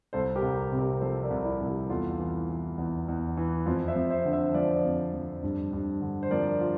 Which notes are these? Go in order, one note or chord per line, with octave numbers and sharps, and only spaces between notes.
C2 A4 C5
G4 A#4
C2
C3
G4 A#4
F3 A4 C5
A#4 D5
C2
E4
C2
E4 G4
E2 F4 A4
E3
E3
E2
E2
E3
F2 F4
C5 E5
F2
C5 E5
D3
C5 E5
F3 D5 F5
F2
F2
G2
G2
D3
C5
F3 A#4 D5
F4